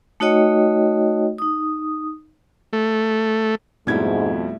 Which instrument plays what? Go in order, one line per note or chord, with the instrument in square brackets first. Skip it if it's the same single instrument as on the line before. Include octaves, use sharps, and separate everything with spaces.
[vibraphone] A3 D#4 F#4 C#5 D#5 G5
D#4 D#6
[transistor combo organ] A3
[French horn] F2 [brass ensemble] G#2 [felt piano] B2 G#6 [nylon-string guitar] G3 A3 E4